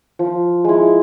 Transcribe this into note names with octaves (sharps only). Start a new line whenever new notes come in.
F3
G#3 E4